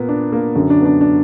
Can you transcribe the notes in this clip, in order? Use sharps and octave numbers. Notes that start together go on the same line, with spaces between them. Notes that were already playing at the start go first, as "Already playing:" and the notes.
Already playing: A#2 A#3 B3
D4
A#3
F#2 D3 F#3
D4
B3
D4
D4